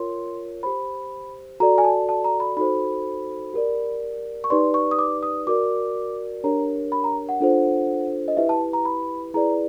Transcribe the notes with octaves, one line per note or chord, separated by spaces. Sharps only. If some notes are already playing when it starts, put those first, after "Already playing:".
Already playing: F4 A#4 C#5 C6
G4 C5 B5
F#4 A4 D5 A#5
G#5
A5
A5
A#5
B5
D#4 F#4 A4 C5 B5
G4 A#4 D5
C#6
D#4 G4 B4 D5 C6
C#6
D#6
D6
D#6
F#4 A#4 D5 D6
D4 G4 A#4 C#5 A#5
B5
A#5
F#5
D4 F4 A4 C5
D#5
E4 G4 B4 E5
A5
A#5
B5
E4 G#4 B4 D5 A#5